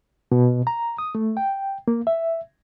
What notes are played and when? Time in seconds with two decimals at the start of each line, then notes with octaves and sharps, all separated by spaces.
0.32 B2
0.67 A#5
0.98 D#6
1.15 A3
1.37 G5
1.88 A#3
2.07 E5